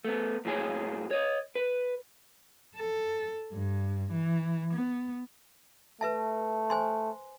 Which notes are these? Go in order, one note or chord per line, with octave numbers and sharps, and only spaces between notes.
A3 B3
F#2 A2 F#3 G#4 C#5
C#5 D#5
B4
A4
G2
E3
B3
A3 B4 E5 A5
C5 G#5 C6